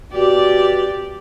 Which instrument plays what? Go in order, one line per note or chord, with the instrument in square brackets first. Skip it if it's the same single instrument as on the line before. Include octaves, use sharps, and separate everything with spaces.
[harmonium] B2 [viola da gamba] G4 D5